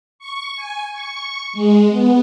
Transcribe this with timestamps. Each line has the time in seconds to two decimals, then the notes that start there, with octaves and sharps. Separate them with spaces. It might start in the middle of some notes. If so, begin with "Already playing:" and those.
0.19 C#6
0.56 G#5
0.91 C#6
1.53 G#3
1.89 B3